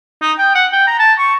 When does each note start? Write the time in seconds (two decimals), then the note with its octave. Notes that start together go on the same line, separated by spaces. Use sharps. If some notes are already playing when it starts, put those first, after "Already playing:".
0.22 D#4
0.38 G5
0.55 F#5
0.73 G5
0.87 A#5
0.99 A5
1.18 C#6